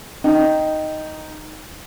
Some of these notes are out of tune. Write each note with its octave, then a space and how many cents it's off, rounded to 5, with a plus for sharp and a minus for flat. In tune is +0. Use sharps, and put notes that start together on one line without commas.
D#4 +0 G5 -10